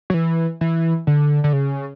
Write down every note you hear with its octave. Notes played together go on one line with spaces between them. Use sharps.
F#3
E3
E3
D3
D3
C#3